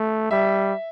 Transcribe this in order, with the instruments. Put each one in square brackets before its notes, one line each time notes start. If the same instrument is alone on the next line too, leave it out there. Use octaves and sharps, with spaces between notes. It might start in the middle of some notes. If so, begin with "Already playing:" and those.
Already playing: [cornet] A3
[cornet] G3 [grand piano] E5